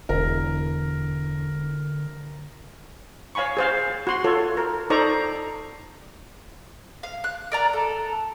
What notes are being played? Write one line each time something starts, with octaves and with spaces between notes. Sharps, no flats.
E1 D3 A#4
C#5 F5 G#5 B5 C#6
G#4 C5 F5
F#4 C6
F4 A4 C#5
A#4
D#4 A4 C5 D5 A#5 C#6
F5
F#6
A#4 D5 A#5
A4